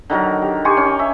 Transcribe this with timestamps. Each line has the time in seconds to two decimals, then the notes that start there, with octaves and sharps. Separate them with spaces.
0.10 D3 D#3 F#3 A#4
0.42 G4
0.65 G4 G#5 C6 C#6
0.77 C#4
0.99 E5